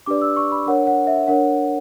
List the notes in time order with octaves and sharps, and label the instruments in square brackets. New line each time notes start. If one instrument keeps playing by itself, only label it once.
[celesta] D4 G4 B4 D5 D6
E6
C#6
B5
D4 A#4 C#5 F#5
F#5
E5
D4 A#4 C#5 F#5